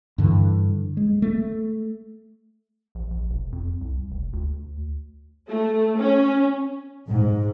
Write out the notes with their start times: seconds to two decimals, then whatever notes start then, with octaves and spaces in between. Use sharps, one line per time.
0.18 G2 D3 E3
0.97 G#3
1.22 A3
2.95 A#1
3.10 A#1
3.30 E1
3.52 F2
3.81 C2
4.11 F1
4.33 D2
5.49 A3
5.98 C#4
7.09 G#2